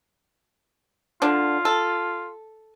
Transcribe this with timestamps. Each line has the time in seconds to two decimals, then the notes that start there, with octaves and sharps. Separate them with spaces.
1.22 D3 D4 F4
1.65 A4